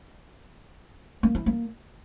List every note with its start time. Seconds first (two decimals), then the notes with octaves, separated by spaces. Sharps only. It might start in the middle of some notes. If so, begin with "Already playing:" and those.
1.23 A#3
1.35 E4
1.46 A#3